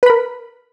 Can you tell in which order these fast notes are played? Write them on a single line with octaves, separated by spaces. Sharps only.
B4 B5 A#4